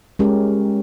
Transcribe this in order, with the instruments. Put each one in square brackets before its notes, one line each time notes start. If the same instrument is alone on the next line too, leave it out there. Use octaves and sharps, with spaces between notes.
[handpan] G#3 C#4 G4 A#4